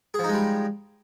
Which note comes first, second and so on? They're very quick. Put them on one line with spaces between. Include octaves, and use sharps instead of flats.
G#4 F3 D#4 G#3 G3